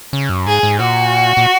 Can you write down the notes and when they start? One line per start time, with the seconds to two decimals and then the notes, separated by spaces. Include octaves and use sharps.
0.13 C#3
0.29 F#2
0.46 G#2 G#4
0.63 G#2
0.80 A#2 F#4
1.37 A#2